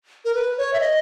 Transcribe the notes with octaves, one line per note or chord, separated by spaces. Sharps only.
A#4
B4
C#5
E5
D#5